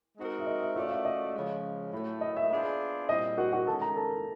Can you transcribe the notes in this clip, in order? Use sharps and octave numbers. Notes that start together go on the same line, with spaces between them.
G#3 C4 D#4 F#4 A#4
E5
D#5
E5
A3 C#4 F4 F#4 A4 D5 F5
F5
E5
D#5
C#3 F3 G#3
A2 F#3 A3
D#5
E5
B3 D4 F4 G#4 C5
A#2 G3 C4 E4 D#5
F#4 F#5
F#4 F#5
D#3 G#3 C#4 A4 A5
A#4 A#5
A4 A5